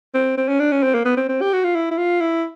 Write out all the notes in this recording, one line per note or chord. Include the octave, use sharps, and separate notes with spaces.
C4
C4
C#4
D4
C#4
C4
A#3
B3
C4
C4
G4
F#4
F4
E4
E4
F4
E4